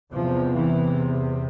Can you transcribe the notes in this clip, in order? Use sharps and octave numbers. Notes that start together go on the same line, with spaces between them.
E2 C3 F3
E3